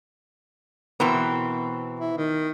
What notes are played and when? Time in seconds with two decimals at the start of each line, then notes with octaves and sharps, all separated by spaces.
1.00 B2 E3 B3 C4 A#4 B4
2.00 E4
2.17 D#3